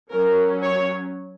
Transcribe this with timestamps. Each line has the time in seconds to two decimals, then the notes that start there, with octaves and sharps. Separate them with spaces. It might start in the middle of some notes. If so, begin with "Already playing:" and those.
0.11 F#3 C#4 A#4
0.63 C#5